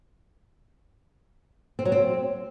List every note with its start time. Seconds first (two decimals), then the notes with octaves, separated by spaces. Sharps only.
1.79 C4
1.85 F#3
1.92 C4